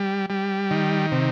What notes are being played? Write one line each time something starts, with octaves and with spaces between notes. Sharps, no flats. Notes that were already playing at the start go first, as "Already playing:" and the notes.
Already playing: G3
G3
D#3
C3